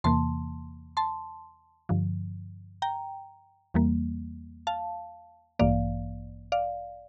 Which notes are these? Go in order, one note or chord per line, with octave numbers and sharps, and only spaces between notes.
E2 C3 E3 A#3 A5 C6
A5 C6
G2 D3 F3
G5 A#5
E2 E3 G3 A#3
F5 A5
A1 G2 E3 A#3 D5 F5
D5 F5